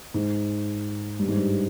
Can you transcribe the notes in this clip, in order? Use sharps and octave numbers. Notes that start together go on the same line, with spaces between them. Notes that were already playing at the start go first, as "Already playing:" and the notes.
G#2
G2
G#2
G2